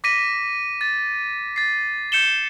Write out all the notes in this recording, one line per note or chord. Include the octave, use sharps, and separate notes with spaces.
D6 A#6 B6 D#7
A6
A6 C7
G6 C#7 E7 G7